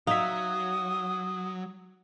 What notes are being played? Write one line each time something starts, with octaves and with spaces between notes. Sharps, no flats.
F#3 D#4 E5 F5 D#6